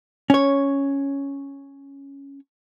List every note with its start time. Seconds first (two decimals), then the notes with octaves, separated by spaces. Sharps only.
0.30 C#4 C#5